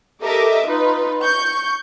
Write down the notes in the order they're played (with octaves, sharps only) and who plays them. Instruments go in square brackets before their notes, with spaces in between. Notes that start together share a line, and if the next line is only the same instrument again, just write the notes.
[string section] G4 A4 A#4 D#5 E5 D6
D#4 F4 B4
C#6 G6